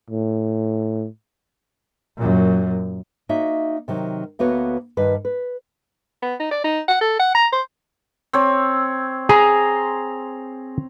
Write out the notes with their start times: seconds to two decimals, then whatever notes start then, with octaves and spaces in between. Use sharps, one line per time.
0.10 A2
2.18 F#2 A#2
3.29 A#3 D#4 F#4 C#5 E5
3.88 C3 D#3 F#3
4.39 D2 A#3 B3 F#4 B4 C#5
4.97 G2 D#3 B4
5.25 B4
6.23 B3
6.40 D#4
6.51 D5
6.64 D#4
6.88 F#5
7.01 A4
7.19 F#5
7.35 A#5
7.53 C5
8.33 C4 C#5
9.29 G#4 A#5 C6